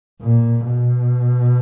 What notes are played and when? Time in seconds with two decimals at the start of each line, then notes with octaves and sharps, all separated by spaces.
0.22 A#2
0.65 B2